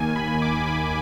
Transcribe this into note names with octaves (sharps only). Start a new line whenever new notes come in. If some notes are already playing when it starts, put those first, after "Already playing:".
Already playing: D#2 D#3 A#3 G#5
D#2 B5
D6
D#3 A#3
B5